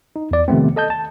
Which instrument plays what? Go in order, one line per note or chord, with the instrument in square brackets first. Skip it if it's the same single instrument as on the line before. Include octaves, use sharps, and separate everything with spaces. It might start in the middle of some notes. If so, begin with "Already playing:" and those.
[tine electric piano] D#4
E2 D5
C3 D#3 F3 A3 B3 C4
A4 D#5 A5 G6
A5